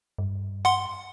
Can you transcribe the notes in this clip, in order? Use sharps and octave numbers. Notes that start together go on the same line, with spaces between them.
G2
F#5 C6